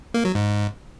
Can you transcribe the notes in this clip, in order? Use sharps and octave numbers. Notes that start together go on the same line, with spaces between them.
A#3
F#3
G#2